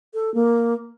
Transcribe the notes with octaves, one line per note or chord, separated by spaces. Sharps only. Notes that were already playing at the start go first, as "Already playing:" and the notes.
A4
A#3